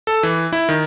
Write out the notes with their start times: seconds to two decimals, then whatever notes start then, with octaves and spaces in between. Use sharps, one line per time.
0.07 A4
0.23 E3
0.53 E4
0.69 D#3